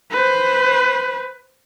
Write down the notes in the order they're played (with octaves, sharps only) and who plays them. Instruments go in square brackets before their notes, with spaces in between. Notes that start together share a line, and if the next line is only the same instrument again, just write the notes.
[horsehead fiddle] B4 C5